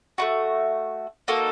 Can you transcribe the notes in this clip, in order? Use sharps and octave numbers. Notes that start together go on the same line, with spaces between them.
A3 D4 F#4
A#3 D#4 F#4 A4